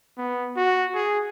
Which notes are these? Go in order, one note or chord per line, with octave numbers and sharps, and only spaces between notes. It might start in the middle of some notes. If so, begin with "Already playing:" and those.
B3
F#4
G#4